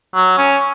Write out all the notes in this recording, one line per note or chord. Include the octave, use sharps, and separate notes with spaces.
F#3
C#4